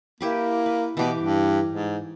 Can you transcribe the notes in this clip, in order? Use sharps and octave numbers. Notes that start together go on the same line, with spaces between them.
A#3 E4 G4 B4
B4
B2 E3 G4 D6
G2
G#2